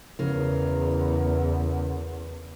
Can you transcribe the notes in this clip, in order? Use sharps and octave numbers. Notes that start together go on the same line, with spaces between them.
E2 C#3 A#4